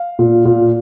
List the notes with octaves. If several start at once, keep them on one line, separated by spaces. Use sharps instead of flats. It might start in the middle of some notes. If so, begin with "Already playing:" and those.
Already playing: F5
A#2
A#2